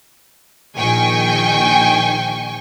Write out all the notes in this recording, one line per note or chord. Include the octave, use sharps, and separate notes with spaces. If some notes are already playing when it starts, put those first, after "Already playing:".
A#1 D#3 G5 G#5 C#6